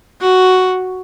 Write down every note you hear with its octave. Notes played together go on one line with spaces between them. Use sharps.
F#4